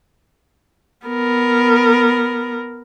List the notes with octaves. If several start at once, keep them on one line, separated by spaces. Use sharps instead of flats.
B3 A#4